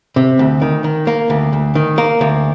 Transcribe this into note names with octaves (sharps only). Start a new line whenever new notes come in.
C3
D2
D#3
D#3
A#3
D2
D2
D#3
A#3
D2